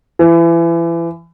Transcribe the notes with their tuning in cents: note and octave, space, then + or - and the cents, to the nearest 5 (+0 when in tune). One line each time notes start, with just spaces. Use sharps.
E3 +30